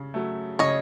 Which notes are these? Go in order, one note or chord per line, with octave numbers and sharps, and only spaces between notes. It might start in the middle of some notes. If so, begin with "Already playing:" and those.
Already playing: C#3
F#3 A3
C#3 C#5 D#5